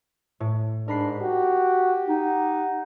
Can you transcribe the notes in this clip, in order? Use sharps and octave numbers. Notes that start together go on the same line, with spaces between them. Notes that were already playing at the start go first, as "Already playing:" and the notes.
A2
G#2 D4 A#4 B5 C7
F#4 G4
D#4 F#5